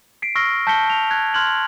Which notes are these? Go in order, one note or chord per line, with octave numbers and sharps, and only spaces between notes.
B6 C7 D7
C#6 E6 F6 A#6 C7 G7
A5 G6 A#6 B6 C#7 G7
F7
F#6 G#6
C6 F6 F#6 G#6 F#7